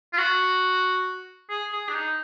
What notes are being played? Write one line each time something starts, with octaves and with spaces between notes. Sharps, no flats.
F4
F#4
G#4
G#4
D4
D#4